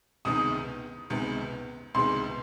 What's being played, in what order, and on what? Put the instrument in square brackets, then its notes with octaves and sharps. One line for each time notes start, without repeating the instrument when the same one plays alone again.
[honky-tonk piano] C#2 C3 D#3 G#3 B3 [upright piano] D#6
[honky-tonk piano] C#2 C3 D#3 G#3 B3
[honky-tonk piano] C#2 C3 D#3 G#3 B3 [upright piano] C6